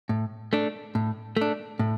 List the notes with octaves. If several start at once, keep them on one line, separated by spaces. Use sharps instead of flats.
A2
A3 D4
A2
A3 D4
A2